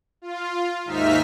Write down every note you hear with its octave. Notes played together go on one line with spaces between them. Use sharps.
F4
D#2 G#2 D#4 E5 F6 B6